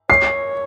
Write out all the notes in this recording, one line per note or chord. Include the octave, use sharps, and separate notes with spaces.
C#5 C7